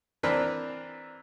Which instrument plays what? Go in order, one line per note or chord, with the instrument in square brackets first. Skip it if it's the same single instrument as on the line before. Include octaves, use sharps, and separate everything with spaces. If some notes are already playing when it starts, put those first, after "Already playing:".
[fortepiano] E3 C4 D4 A#4 B4